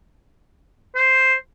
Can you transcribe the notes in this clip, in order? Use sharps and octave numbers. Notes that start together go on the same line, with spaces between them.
C5